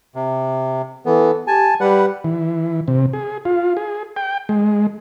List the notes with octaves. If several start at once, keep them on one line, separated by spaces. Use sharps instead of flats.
C3
E3 B3 A4
G4 G#5 A5
G3 B4 F#5
E3
C3
G#4
F4
G#4
G5
G#3